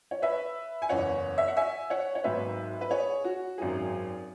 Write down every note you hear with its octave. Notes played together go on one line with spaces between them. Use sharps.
C#5
B4 E5
G#5
F#1 E2 E3 C#5 F#5
E5
F#5
E5 G#5
C#5 F#5
C#5
G#1 G#2 F#3 B4 E5
B4
G#4 C#5
F#4
G#1 F#2 F#3 G#4